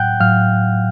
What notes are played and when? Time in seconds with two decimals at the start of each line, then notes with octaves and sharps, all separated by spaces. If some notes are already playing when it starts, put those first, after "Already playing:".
Already playing: A2 F#3 F#5 G5 F#6 G6
0.20 A2 F#3 F5 F6